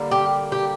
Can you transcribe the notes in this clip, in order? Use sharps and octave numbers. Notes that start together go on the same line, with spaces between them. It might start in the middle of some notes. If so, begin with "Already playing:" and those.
Already playing: D3 G3 A#3
G4
G4